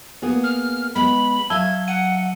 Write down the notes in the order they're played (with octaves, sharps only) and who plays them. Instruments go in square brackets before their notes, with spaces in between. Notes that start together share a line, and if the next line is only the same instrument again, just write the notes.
[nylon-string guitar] A#3 B3 G#4
[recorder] F6
[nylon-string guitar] G#3 B3 [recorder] B5
[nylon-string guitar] F#3 E5 F5 [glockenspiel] A5 E6 G7 [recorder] G#6
[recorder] F#5 [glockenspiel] D#7